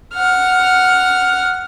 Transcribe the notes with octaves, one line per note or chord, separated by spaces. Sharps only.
F#5 F6